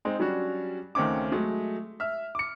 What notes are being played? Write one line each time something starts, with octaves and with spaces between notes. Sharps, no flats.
G#3 C4 D#4
F#3 G3 C#4 D4 F#4
C#2 D#3 A3 C4 C#4 D6
F#3 G#3 A3
E5 F6
D6 C#7